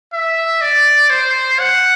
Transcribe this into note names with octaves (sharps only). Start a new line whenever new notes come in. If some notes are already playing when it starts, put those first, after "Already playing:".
E5
D5
C5
F#5